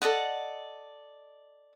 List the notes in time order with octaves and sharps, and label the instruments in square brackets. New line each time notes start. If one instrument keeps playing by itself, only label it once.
[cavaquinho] A4 D5 D#5 F#5